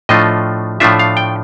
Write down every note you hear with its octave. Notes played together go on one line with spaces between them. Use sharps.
A2 F3 A3 D4 F4 D#5
A2 F3 A3 D4 F4 E5
F5
G5